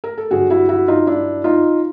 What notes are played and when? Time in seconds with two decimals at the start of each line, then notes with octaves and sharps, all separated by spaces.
0.04 A#4
0.18 A4
0.31 G2 D3 F#3 F#4 G#4
0.50 E4 F#4
0.69 E4 F#4
0.88 D#4 F4
1.07 D4 E4
1.44 D#4 F4